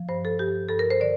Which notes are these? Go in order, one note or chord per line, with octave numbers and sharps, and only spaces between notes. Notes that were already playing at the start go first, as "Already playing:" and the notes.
Already playing: F3
G2 C5
A4
G2 G4
G2 A4
A#4
C5
D3 D5